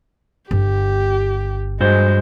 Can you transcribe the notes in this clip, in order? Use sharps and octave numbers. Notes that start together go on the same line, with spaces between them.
G1 G4
G2 G#3 F#4 C5